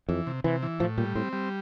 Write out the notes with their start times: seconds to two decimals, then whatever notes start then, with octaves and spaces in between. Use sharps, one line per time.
0.09 F2 E3
0.27 C3
0.44 C3 E3
0.63 E3
0.80 A2 F3
0.98 A#2 G3
1.15 A2 C4
1.33 G3